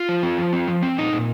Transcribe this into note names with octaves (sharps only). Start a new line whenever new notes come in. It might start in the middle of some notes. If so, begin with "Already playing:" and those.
Already playing: F4
F3
C4
F3
C4
F3
C4
A#2 D#4
A#2